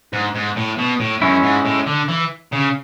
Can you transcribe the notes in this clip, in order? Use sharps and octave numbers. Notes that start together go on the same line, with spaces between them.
G#2
G#2
A2
B2
A2
F#2 G#3 C#4 E4
G#2
A2
D3
E3
C#3